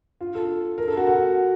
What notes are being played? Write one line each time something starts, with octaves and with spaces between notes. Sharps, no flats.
F4
A4
A#4
A4
F#4
F#4